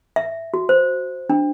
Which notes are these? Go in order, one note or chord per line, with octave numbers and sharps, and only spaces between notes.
E5
F#4
C5
D4